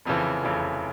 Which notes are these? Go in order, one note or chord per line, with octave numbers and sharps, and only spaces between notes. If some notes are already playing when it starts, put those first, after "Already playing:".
F1 F2 C#3 E3
F1 F2 C#3 E3